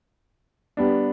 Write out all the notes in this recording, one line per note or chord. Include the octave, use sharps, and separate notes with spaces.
G3 B3 D4